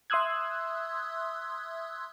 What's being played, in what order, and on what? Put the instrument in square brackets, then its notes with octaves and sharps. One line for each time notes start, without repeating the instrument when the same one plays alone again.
[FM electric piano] E5 C6 D#6 E6 F#6 G#6